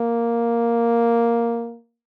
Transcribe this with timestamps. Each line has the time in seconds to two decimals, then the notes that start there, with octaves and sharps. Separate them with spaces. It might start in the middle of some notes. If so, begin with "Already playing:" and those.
Already playing: A#3